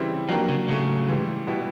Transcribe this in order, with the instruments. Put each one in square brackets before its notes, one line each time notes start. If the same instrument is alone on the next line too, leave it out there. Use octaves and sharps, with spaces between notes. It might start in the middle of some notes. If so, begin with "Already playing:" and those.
Already playing: [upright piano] C#3 E3 G3 C4 E4
[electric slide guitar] F3 [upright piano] F#3 A#3 D4 G4 A#4
[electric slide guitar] C#3
[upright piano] A2 F#3 A3 [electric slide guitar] C#3
[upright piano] G#2 E3 G3
B2 G3 B3 E4